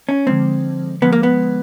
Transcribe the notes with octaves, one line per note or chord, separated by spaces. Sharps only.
C#4
D3 F3 G#3 C4
D3 F3 G#3 B3
A#3
B3